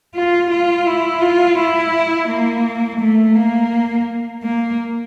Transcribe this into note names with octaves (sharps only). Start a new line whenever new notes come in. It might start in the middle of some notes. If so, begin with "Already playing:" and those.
F4
F4
E4
F4
E4
A#3
A3
A#3
A#3